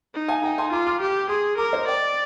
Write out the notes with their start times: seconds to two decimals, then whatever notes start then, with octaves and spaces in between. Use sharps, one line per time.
0.14 D#4
0.28 F5 G#5
0.43 D#4 G5 A#5
0.58 G#5 C6
0.72 F4 A#5 D6
0.87 D6 F6
1.01 G4
1.29 G#4 C6 D#6
1.58 A#4 A#5 D6
1.73 C5 D#5
1.87 D5 D#5 G5